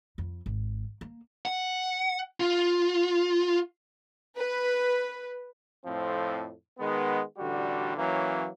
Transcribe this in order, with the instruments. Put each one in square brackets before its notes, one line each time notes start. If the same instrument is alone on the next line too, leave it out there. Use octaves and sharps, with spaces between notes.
[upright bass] F2
G#1
A#3
[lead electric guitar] F#5
F4
[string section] B4
[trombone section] F2 A2 F3 C4
D#3 G#3 B3
A1 D3 G3 F#4
E3 F#3 A#3 C#4